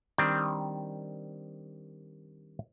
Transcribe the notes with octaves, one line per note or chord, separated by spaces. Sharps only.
D#3 G3 C4 D4